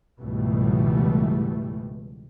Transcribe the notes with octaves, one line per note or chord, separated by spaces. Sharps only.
C#2 G#2 B2 E3 G3 A3